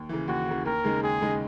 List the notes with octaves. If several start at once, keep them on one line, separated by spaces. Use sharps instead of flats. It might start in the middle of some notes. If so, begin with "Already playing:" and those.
Already playing: D#2
C#3 E3
D#2 F#4
C#3 E3
D#2 A#4
C#3 G#3 D#4
D#2 G#4
C#3 G#3 D#4